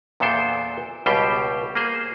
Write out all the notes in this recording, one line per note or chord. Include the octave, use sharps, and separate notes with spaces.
E2 A#2 B3 A4 C5 G5
C#2 B2 G3 G4 C5 G5
A#3 G#4 C5